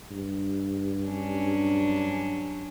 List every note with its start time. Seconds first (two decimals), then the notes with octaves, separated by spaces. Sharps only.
0.11 G2
1.08 F#3 C#4 D4